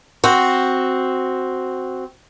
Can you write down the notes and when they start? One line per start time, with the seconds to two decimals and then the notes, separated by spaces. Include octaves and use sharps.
0.24 C4 F#4